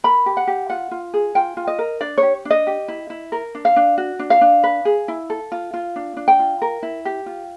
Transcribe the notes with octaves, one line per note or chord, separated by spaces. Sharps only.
A#4 B5
G4
F#5
G4
F4 F#5
F4
G#4
F4 G5
F4
D#5
A#4
D4 D5
C#5
G4
D4
D#5
G4
E4
E4
A#4
D4
F5
D4
F#4
D4
F5
D4
B4
G#4
E4
A4
F4
F4
D4
D4
G5
F4
A#4
E4
G4
F4